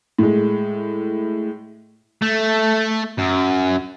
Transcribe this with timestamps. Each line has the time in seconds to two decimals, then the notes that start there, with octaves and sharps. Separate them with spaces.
0.19 A2 G#3
2.22 A3
3.19 F#2